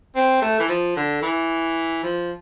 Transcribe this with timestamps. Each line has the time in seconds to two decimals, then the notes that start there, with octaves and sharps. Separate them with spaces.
0.15 C4
0.42 A3
0.59 E3
0.68 F3
0.96 D3
1.22 E3
2.03 F3